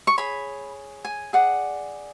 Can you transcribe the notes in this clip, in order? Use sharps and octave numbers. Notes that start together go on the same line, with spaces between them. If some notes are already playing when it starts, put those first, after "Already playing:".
C#6
G#4 C#5 B5
G#5
G#4 D5 F#5